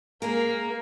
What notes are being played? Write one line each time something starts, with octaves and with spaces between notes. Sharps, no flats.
G#3 A#3 G#4 A#4